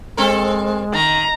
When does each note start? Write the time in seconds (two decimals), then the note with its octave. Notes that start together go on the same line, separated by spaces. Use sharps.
0.17 G#3 C4 A4 A#4
0.94 D#3 A#5